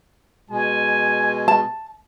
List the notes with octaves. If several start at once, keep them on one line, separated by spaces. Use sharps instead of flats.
B2 G#3 G#5
A5